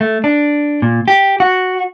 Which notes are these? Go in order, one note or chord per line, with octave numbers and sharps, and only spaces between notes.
A3
D4
A#2
G4
F#4